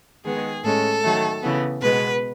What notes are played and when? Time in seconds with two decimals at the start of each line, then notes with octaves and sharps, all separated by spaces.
0.25 D#3 G#3 B3 G#4
0.64 A2 G#3 C#4 A4
1.03 D#3 F#3 A3
1.42 C#3 E3 B3
1.82 B2 G#3 B3 B4